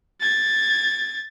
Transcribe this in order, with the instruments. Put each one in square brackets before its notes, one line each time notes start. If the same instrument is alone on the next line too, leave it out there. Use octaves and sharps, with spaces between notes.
[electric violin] G#6 A6